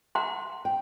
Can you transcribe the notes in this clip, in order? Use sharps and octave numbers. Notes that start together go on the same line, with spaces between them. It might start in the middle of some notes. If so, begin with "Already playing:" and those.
F#5 A#5 C6
G5